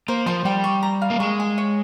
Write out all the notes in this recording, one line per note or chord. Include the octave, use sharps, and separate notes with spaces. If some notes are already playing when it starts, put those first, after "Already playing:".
A#3 C5
F3 C6
G3 G5
C#6
A#5
F5
A#3
G#3 C#6
G#5
C#5